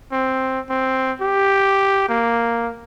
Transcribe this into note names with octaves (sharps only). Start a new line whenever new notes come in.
C4
C4
G4
A#3